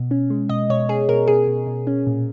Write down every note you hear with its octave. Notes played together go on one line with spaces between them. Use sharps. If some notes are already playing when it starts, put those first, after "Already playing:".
Already playing: B2
C#4
G#3
B2 D#5
B2 C#5
C#4 G#4
B2 A#4
B2 G#4
B2
B2
C#4
A#2